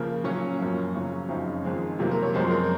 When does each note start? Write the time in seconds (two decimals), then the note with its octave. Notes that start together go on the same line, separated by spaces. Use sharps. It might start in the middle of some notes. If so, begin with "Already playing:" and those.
Already playing: C#3 F3 A#3
0.24 A#2 F#3 A#3 C#4
0.59 F#2 F3 A#3
0.94 F2 C#3 F#3
1.29 F#2 C#3 F3 C4 D#4
1.64 F2 D#3 G#3 C4
1.99 C3 F#3 A#3 F4
2.11 A#4
2.22 C#5
2.34 F#2 F3 G#3 C4 C5
2.51 A#4